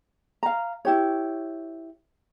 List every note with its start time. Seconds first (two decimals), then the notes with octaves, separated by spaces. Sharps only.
0.43 F5 A#5
0.85 E4 G4 C#5